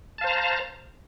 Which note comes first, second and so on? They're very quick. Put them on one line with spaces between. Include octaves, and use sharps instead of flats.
A5 F5 C5 A#5